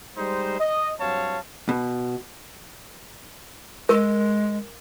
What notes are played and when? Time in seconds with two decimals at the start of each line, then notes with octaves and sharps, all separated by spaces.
0.17 G3 G#3 D#4 C5
0.59 D#5
0.99 G2 F#3 C4 C#5 F5 A5
1.69 B2
3.89 G#3 A#4